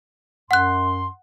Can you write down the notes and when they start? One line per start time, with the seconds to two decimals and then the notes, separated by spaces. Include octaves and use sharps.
0.51 F#2 F#5 C6 F#6